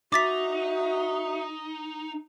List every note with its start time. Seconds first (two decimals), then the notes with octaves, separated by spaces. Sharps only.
0.12 D#4 F#4 E5 D6 A6 B6